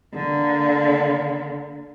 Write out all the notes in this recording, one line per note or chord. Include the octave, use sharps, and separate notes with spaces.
D3 A#3